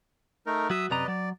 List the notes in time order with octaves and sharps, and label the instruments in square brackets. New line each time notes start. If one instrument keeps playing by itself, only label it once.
[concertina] A3 D#4 A#4
[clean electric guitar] F#3 F#4 [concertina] E5 D#6 E6
[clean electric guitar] F#2 C3 A#5 [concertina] B4 D5 D#5
[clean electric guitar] F#3 [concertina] D5